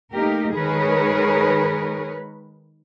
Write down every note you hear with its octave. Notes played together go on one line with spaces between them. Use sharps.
A3 A#3 D#4 G4 A#4
D#3 G#3 G#4 A#4 B4 C#5